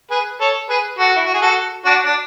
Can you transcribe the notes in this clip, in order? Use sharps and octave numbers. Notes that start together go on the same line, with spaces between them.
G#4 B4
A4 C#5
G#4 B4
F#4 A4
E4
F#4
G#4
F#4 A4
D4 F#4
D4